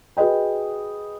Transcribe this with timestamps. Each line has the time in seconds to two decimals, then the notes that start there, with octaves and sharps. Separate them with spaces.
0.17 F#4 G#4 B4 D#5 G5